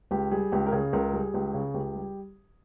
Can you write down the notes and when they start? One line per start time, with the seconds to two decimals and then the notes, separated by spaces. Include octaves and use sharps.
0.11 C#2 G4
0.31 G3 G#4
0.52 C#2 G4
0.67 A#4
0.72 C#3 G#4
0.93 C#2 A#4
1.13 G3 G#4
1.34 C#2 G4
1.54 C#3
1.74 C#2 G4
1.95 G3